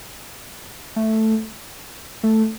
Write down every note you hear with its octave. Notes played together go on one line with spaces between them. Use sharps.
A3
A3